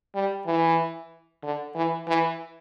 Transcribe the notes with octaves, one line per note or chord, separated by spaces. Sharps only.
G3
E3
D3
E3
E3